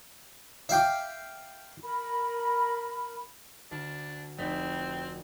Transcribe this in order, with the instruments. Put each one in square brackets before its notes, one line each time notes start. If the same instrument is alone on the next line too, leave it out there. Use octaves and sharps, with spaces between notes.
[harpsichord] E5 F5 G5 D6
[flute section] A#4 B5
[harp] D2 [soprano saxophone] D4
[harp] F1 B6 E7 [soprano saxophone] C4